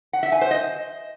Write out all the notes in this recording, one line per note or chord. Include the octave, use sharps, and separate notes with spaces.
F#5
E5
G#5
C5
D#5